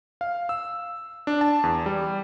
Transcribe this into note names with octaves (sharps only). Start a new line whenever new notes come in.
F5
E6
D4
A5
E2
G3